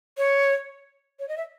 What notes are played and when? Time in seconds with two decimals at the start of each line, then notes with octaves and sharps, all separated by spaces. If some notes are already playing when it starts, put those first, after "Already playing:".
0.18 C#5
1.20 C#5
1.29 D#5
1.37 E5